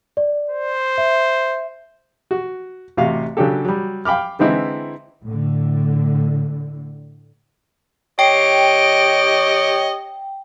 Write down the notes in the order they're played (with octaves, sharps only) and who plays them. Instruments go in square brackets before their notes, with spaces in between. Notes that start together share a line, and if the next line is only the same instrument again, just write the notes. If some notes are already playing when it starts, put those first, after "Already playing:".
[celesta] D5
[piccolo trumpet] C5
[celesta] E5
[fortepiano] F#4
A1 C3 F#4 F5
C#3 F#3 D4 G4 A4
F#3 G3
F5 G5 B5 D6 F6
D3 E3 G#3 C4 D#4 E4
[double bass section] A2 D3
[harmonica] G4 C#5 [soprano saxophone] D#5 [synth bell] G5 [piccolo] D7